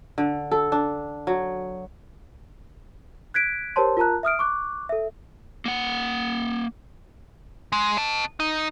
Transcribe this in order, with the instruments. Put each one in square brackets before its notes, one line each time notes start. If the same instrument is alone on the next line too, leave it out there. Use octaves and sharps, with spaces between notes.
[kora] D3
A4
D4
F#3
[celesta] F#6 G#6 B6 D7
G4 A#4 C5 C#5 A5 C6
F4 A#4 A5 A#5 F#6
E5 D#6 F6 D7
C#6 D6 F#6
A4 E5
[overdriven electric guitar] A#3 F#5
[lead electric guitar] G#3
D#5 A5
D#4